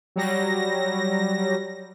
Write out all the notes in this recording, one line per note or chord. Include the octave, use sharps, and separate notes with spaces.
F#3 G3 A#6